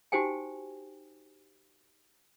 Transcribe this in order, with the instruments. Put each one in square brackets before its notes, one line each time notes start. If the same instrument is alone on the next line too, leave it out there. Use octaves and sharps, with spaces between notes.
[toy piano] D#4 F#4 G4 C5 G5 G#5